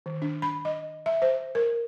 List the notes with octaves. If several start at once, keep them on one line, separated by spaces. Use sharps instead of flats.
D#3
D4
B5
D#5
E5
C5
A#4